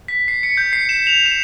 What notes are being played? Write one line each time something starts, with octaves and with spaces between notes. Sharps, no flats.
B6
C7
C#7
G6
C7
E7
F7
E7